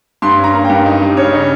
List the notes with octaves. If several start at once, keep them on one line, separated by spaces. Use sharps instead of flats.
G2 C6
C#4
A#5
A#3
G5
G2
D#4
G3
C#3 C#5
D#4